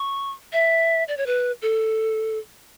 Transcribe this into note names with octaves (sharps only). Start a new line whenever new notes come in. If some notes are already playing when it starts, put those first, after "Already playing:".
Already playing: C#6
E5
D5
C#5
B4
A4